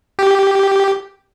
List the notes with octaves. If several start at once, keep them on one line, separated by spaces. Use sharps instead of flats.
G4